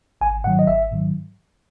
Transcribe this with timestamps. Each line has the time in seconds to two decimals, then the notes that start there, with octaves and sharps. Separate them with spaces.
0.21 G#1 G#5
0.44 G#2 D#3 F#3 F#5
0.59 D#5
0.67 G#1 E5
0.91 G#2 D#3 F#3